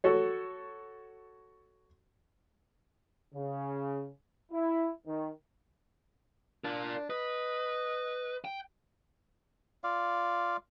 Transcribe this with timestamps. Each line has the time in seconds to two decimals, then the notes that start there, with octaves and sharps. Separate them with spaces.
0.04 F#4 A4 C#5
3.35 C#3
4.52 E4
5.06 D#3
6.65 D4 A#4 D5
7.10 B4 D#5
8.45 G5
9.84 F4 D5 F5